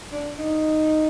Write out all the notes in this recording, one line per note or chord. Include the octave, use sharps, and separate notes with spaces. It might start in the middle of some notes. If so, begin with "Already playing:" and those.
D4
D#4